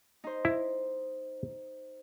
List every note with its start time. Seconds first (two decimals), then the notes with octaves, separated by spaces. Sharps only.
0.24 D#4 C5
0.45 E4